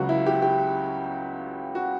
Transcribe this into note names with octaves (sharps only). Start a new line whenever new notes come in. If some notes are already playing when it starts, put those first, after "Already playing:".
Already playing: C#2 C#3 F#3 F#4
E4
G4
G4
F#4